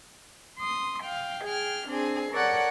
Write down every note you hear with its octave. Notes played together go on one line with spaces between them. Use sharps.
C6 D#6
F5 G5
G#4 G5 F6
C4 D4 G#4
A4 A#4 C#5 D5 F#5 F#6